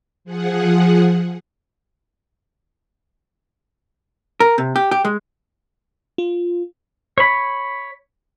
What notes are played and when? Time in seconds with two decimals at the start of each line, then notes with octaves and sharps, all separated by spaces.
0.25 F3 G#4 F#5
4.40 A#4
4.58 C3
4.76 G4
4.91 G4
5.05 G#3
6.18 F4
7.18 C#5 B5